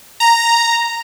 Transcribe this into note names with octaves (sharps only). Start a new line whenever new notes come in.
A#5